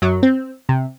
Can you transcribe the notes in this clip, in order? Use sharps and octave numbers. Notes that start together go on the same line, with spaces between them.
F#2 F#3
C4
C3